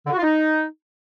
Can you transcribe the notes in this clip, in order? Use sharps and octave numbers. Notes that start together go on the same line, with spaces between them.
D3
F#4
F4
D#4